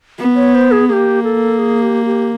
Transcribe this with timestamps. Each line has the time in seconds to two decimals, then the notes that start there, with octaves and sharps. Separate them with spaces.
0.19 B3
0.36 C#5
0.55 C5
0.71 G#4
0.88 A#3 G4 G#4
1.24 A4
1.59 G#4
1.82 G4
2.06 G4